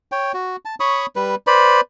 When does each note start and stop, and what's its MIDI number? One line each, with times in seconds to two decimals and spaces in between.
0.12 0.32 73
0.12 0.32 79
0.34 0.56 66
0.65 0.75 81
0.80 1.06 73
0.80 1.06 83
0.80 1.06 85
0.80 1.06 87
1.16 1.35 55
1.16 1.35 71
1.47 1.81 71
1.47 1.81 72
1.47 1.81 74
1.47 1.81 83